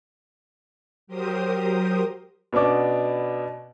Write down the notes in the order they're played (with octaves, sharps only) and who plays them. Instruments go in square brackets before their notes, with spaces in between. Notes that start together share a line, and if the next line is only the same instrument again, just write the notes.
[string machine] F#3 G4 A#4 C5 D#6
[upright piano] B2 B3 C#4 D4 D6